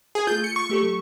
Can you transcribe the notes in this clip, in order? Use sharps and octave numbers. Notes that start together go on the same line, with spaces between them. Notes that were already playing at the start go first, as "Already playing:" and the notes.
G#4
A3 F4 G6
C#7
C#6
A3 G4 A4
F#3